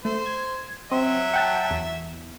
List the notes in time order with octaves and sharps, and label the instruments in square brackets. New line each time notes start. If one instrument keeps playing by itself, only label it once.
[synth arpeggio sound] A3 [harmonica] C5
[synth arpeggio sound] G#6
[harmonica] F#3 E5 [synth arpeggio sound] C4
[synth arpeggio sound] F#5 G5 A5
E2